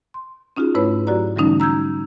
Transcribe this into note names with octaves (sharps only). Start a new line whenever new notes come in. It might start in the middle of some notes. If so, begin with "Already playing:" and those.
C6
C#4 D#4 F4 F#4 G#4
G#2 A3 E4 B4 C#5 B5
F#3 F#4 G4 D5 A#5
D3 E3 G3 A3 C#4 D#4
A#5 E6 G6 G#6